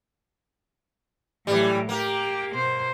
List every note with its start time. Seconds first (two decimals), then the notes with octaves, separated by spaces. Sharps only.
1.47 A2 E3 F#3 G3
1.89 A#3 G4 A#4
2.53 B2 C5